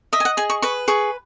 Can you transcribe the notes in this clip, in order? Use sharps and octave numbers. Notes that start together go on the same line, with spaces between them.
D#5 E5
G#5
F#5
G#4 G#5
C#6
B4 C#6
G#4 C#6